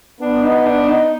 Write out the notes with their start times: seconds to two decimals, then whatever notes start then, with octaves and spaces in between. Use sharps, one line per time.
0.20 B3 D4
0.43 D#4
0.66 D4
0.88 D#4